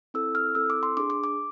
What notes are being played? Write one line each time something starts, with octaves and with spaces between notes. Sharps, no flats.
C4 E4 A4 E6
F6
C4 E4 A4 E6
D6
C6
D4 G#4 D6
D6
D6